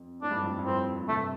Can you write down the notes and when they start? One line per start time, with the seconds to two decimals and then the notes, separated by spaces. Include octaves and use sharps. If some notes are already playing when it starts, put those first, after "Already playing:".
Already playing: F2
0.22 A2 D4
0.31 G2
0.39 F2
0.47 G2
0.59 G2
0.65 F2 A2 C4
1.00 A2
1.08 G2 C3 A3